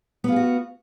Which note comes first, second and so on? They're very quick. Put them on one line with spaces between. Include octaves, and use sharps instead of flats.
B3 F4 G#4 F#4